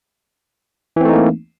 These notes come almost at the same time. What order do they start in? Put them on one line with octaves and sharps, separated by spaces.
E3 C4 A3 D#4 A#3